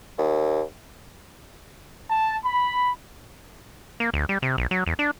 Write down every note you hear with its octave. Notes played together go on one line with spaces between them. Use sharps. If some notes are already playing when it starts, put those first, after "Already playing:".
D#2
A5
B5
A#3
D2
G3
C3
B1
F#3
E2
D4